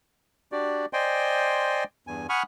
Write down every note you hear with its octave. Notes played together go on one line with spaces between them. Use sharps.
D4 F#4 G4 D5
C5 D5 D#5 G5 G#5 C6
E2 G2 G#5
F#5 G#5 B5 C#6 D#6 F6